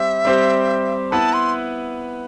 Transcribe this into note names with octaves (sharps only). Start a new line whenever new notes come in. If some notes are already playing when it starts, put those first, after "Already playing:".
Already playing: G3 C4 G4 C5 E5
G3 C4 G4 C5
B3 E4 B4 A5
C6